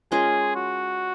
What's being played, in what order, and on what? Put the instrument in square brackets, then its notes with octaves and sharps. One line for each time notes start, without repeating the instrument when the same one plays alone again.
[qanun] G#3 C#4 F4 A#4 [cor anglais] G#4
[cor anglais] F#4